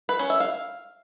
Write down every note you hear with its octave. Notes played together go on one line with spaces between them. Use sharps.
B4
C#4
E5
F5